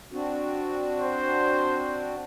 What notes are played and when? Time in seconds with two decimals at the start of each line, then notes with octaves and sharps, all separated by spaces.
0.12 C4 D4 F#4
1.00 C5